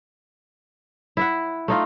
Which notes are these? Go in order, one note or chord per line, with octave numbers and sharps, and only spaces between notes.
E4 E5 F#5
A3 D#4 F4